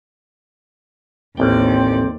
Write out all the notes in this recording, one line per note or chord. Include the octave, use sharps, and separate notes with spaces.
A1 D#2 C4 D5 G5